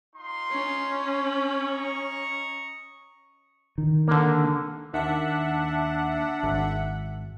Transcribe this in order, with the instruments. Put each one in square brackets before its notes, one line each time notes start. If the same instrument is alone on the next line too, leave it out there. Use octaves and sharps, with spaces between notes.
[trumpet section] D#4 F4 C6
[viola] C#4
[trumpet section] D#5 A#5 C#6
[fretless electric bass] D#3
[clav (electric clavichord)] D3 A#3
[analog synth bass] D#2 [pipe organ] D4 [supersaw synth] E5 F#5
[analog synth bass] G#1